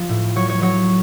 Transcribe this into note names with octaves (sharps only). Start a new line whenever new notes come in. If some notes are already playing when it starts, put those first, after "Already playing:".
Already playing: F3
A2
F#3 C#5
C#5
F#3 C#5